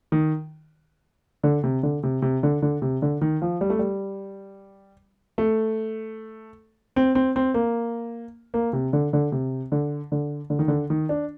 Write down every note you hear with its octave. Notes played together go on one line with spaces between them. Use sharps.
D#3
D3
C3
D3
C3
C3
D3
D3
C3
D3
D#3
F3
G3
A3
G3
A3
C4
C4
C4
A#3
A#3
C3
D3
D3
C3
D3
D3
D3
D#3
D3
D#3
D4